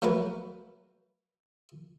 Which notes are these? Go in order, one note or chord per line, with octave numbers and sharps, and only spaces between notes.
F3 F#3 A3 F#4 A#4 B4